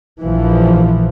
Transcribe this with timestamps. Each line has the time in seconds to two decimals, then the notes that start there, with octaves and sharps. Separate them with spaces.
0.22 A#1 E3 F3